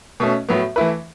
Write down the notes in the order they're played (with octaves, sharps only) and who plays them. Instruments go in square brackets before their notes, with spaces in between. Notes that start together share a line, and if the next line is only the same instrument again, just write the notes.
[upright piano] B2 A3 C#4
A2 F#3 B3
E3 A3 E4 B4